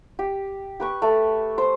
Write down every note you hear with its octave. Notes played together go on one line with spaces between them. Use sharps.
G4
G4 B4 C#6
A3
C5